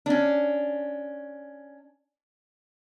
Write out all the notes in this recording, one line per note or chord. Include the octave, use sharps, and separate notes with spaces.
C#4 D4